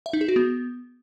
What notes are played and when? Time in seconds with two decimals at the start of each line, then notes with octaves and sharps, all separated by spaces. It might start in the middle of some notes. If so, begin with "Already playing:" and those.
0.06 E5
0.13 D#4
0.21 G#4
0.28 F#4
0.36 B3